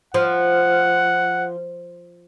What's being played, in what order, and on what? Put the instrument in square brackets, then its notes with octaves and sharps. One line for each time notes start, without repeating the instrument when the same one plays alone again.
[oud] F3 [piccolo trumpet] F#5